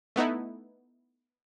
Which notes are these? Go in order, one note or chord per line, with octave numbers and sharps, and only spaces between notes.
A3 B3 D#4 E4